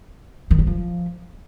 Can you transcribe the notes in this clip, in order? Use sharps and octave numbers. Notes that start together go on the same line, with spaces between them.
D#3
G3
F3